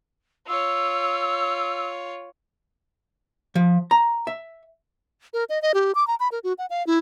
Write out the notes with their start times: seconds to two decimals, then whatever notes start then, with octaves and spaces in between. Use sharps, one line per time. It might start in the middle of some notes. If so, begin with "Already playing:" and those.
0.47 F4 C#5 E6
3.55 F3
3.91 A#5
4.27 E5
5.33 A#4
5.49 D#5
5.62 D#5
5.74 G4
5.95 D6
6.07 A#5
6.20 B5
6.32 A#4
6.44 F#4
6.58 F#5
6.70 F5
6.87 E4